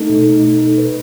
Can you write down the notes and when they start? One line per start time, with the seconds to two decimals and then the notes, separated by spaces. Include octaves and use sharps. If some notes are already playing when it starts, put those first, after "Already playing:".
Already playing: A3 D#4 A4
0.09 B2
0.27 D#4
0.44 D#4
0.61 A4
0.78 B4